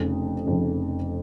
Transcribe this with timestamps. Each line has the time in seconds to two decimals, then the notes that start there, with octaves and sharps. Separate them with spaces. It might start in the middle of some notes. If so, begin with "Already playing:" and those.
Already playing: F1 F2 C#3
0.46 F1 F2 C#3